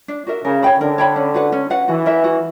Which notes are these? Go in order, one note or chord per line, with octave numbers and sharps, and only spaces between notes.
D4
F#4 A#4 E5
C#3 A#4
C#5 G5 B5
D3 A#4
C#5 G5 B5
C#4
F#4 B4 F#5
C#4
F#4 B4 F#5
E3 F#4
A#4 E5 B5
F#4